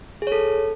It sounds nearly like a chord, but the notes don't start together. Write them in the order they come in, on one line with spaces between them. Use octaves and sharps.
G#4 C#5 A4